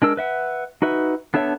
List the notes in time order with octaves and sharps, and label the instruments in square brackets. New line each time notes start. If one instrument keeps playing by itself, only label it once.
[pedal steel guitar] G#3 D4 A#4 E6
B4 E5 F#5
D#4 F#4 B4 E5
B3 D4 A4 C#5 E5